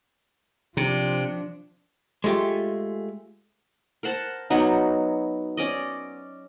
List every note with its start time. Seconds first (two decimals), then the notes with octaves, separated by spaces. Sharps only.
0.77 C3 F3 D4
2.24 G#3 A3 F4 G4
4.03 A#4 C5 F#5 A5
4.50 F#3 B3 D#4
5.57 C#4 D5 D#5